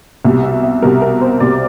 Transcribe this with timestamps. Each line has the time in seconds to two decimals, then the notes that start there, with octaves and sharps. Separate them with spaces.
0.25 C2 B2 G3
0.44 E5
0.63 E5
0.82 C2 B2 G3 A#4
1.02 A#4
1.21 C5
1.40 C2 B2 G3 D5